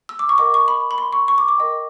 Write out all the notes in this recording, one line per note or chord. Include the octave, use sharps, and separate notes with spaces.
E6
D6
C#6
A#4 D#5 F#5 D6
C#6
B5
B5
C6
C#6
C#6
D6
D6
A#4 D#5 G5